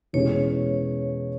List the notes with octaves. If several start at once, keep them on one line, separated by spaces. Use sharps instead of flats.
E2 B2 G#3 C#4 G#4 C#5